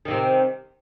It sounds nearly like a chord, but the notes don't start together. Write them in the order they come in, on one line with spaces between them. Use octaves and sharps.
D#3 C3 C4